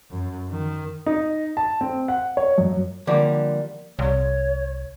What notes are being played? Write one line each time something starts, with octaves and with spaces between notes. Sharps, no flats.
F#2
D#3
D#4
A5
C4
F#5
C#5
F#2
D3 F3 G3 A#3
C2 C#5